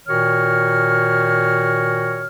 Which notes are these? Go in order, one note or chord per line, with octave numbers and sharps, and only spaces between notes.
A#2 D#3 F#4 C#5 F6